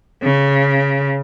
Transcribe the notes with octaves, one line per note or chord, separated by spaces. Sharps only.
C#3